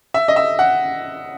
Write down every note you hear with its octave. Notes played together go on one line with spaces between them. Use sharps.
E5
D#5
E5
F#5